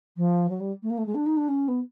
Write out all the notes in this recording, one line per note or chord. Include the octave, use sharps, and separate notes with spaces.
F3
F#3
G3
A3
A#3
A3
G#3
D4
D#4
D4
C#4
B3